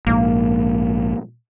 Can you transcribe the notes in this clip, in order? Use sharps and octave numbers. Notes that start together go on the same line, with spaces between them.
A#1 G#2 A#3